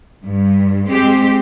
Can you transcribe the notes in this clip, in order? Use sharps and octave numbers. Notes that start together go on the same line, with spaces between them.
G2
G#3 C4 G4